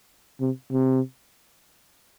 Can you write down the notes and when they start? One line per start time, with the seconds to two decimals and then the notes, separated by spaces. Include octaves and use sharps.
0.41 C3
0.72 C3